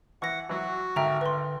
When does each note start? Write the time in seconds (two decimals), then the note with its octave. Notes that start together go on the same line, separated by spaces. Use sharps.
0.22 E3 F#5 C#6 A#6
0.49 E3 F#3 F#4
0.96 G#1 D3 E5 G5 A#5
1.21 B4 C6